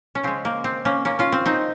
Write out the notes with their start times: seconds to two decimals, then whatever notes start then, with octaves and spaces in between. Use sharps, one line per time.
0.15 C#4
0.23 C#3 G#3 C4
0.45 A#3
0.64 C4
0.85 A#3 C#4
1.05 A#3 C#4
1.19 C#4 F4
1.32 C4
1.46 C4 D#4